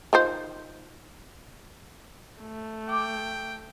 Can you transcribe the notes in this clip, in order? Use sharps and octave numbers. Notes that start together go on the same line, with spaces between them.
D#3 F4 C5
A3
G5 D6